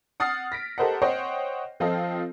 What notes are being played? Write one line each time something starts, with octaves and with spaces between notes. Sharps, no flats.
F#5 D#6 F6 A6 C7
A#6 B6 D7
G4 A4 A#4 C5 D#5 F#5
C5 C#5 D#5 F#5 G5 C7
F3 C4 F4 A4 D#5